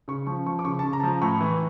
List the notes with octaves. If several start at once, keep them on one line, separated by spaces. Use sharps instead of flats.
C#3 C#6
F3 C#6
F3 C#6
D6
C#3 C#6
A5
C#3
A#5
A5
F3 A#5
A2 C#6
E3